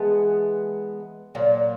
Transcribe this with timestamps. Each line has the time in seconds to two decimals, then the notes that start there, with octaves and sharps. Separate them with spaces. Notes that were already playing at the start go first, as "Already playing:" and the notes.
Already playing: E3 G#3 B3 A5
1.35 A#2 F#3